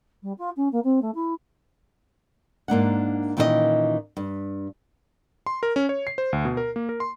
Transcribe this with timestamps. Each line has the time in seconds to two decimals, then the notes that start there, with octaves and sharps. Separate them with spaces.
0.22 G3
0.38 F4
0.56 C#4
0.72 A#3
0.84 C4
1.02 A3
1.14 E4
2.68 G#2 A#3 D4 F#5
3.37 A#2 D#3 E3 C#4 A#4 D#5
4.17 G2
5.46 C6
5.63 A#4
5.76 C#4
5.89 C#5
6.07 C7
6.18 C5
6.33 D2
6.45 B2
6.57 A#4
6.76 A#3
6.89 A#4
7.00 C6